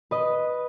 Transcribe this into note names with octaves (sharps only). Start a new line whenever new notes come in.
B4 D#5